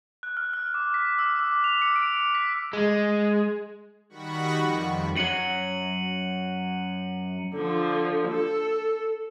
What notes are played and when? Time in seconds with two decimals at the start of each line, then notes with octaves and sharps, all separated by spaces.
0.23 F#6
0.37 F6
0.53 F6
0.74 D6
0.94 B6
1.19 E6
1.39 D6
1.64 F7
1.82 C#7
1.96 D7
2.35 B6
2.73 G#3
4.09 D#3 G3 F#4 F#5 B5 C#6
4.55 F2
5.16 F#2 F#3 C#7 D#7 F#7
7.54 D3 F3
8.27 A4